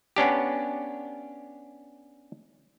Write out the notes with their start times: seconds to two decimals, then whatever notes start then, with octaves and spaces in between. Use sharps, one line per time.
0.16 B3 C#4 D4 G4